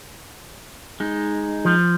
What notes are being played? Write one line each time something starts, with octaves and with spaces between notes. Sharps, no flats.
G#3 D#4
F3